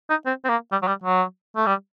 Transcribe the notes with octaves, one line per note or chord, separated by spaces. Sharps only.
D#4
C4
C4
A#3
G3
F#3
G3
F#3
A3
G3